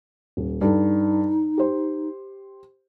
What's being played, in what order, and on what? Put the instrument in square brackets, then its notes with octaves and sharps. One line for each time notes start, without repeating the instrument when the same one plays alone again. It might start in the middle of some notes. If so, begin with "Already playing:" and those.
[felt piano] D#1
[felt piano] G2 A4 [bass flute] D#4
[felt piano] G4 C5